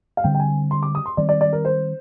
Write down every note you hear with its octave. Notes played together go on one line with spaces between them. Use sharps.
F5
D3 G3 C4 G5
G5
G#5
C6
D6
D#6
C6
D#3 G3 C4 D5
D5
D5
A#4
C5